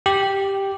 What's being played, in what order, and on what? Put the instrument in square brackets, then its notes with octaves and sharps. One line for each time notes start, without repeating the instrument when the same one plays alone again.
[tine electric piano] G4